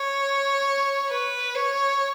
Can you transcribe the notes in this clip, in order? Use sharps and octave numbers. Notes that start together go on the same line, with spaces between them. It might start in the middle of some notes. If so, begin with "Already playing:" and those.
Already playing: C#5
B4
C#5